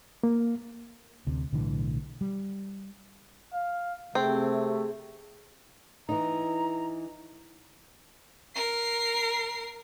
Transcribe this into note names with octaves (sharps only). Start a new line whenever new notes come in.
A#3
D2 C3
B1 A2 D3 E3
G3
F5
C3 A3 C4 G#4
E3 D#4 A#5
A#4 C7